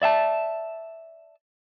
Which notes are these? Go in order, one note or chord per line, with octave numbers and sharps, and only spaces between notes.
D5 E5 F#5 A5